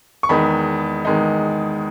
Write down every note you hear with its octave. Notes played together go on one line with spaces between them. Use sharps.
C#6
E2 D#3 G#3 D#4 B5
E2 D#3 G#3 D#4